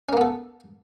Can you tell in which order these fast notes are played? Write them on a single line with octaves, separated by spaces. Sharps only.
C#4 A#3 B3 A4